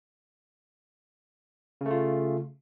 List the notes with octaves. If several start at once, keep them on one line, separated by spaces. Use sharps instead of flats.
C#3 A3 F4